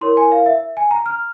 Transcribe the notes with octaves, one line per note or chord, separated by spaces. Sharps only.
E4 A#4 C#5 C6
G#5
F5
E5
G#5
A#5
F6